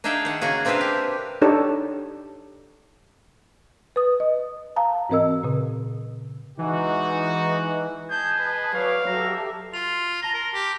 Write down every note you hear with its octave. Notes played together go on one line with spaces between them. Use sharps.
D4 D#4 G#4 E5 F5 G5
D#3 F#5
C#3 A#3 F#4 G#4
A#3 C4 D4 B4 E5 F5
G4
D4 D#4 G4 A4 C#5
B4 D#6
D#5
F5 A5 A#5
G#2 E3 C4 A#4 D#5 E6
A#2 C#3
E3 G#3 D#4 F#4
G#4 D#5 A5 G6
B4
F#3 B4 C#5 D5 F5
F#3 G4 A4 E5 A#5
F4 C6 F7
A5 A#5 A#6 G7
A#4
G4